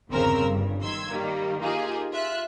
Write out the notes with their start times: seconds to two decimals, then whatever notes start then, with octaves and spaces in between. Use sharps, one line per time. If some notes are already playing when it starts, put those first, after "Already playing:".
0.10 G1 E2 C#3 C4 A#4 E6
0.44 G1 G2
0.81 D#3 C6 E6 G#6
1.10 D#3 G3 A#3
1.61 A#3 D#4 F4 G4 G#4
2.12 F4 E5 F#6